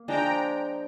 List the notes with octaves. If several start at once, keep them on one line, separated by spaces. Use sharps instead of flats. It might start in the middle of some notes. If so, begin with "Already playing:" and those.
Already playing: A#3
F3 G#3 D4 G5 A#5